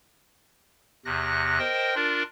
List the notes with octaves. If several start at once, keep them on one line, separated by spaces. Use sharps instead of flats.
E2 C3 F#6 A#6
A#4 C5 D#5 G5
D4 F4 A#4 D5